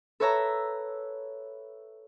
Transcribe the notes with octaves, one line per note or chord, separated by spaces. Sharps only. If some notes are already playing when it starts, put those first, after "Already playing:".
A4 B4 C#5 E5 A#5